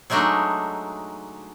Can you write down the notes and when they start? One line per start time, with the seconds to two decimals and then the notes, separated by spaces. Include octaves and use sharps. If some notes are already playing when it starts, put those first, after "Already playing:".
0.10 F#3 G#3 A3 D4 D#4